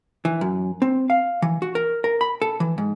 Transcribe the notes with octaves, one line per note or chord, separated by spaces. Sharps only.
E3
F#2
C4
F5
E3
F#4
A#4
A#4
B5
A4
E3
G#2